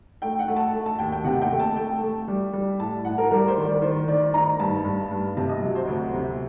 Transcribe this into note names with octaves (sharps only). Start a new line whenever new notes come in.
A3 G5
F#5
A3
A5
A3
A5
D#2 G5
G5
C3 F#5
G5
A3
A5
A3 G5
A3
G3
G3
A2 A5
A2 F#5
A#4
G3 A#4
C5
D#3
D5
D#3 C5
D#3 D5
D#4 A#5
G2 A5
G2
G2
C3 A5
D#5
F#3
C5
D2
C3